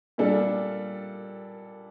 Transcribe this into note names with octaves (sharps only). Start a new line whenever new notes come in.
A#2 G3 D4 A4